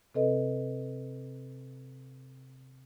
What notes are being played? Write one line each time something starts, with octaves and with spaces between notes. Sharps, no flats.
C3 C4 A4 B4 D#5